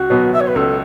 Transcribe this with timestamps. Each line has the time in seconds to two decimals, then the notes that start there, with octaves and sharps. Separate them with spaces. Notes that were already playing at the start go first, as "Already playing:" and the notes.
Already playing: C#2 F#4
0.10 B2 F#3 B3
0.33 E5
0.40 C#5
0.47 B4
0.56 C#2 A4